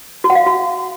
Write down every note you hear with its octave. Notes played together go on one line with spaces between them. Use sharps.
F#4
F#5
F5
E5
F#4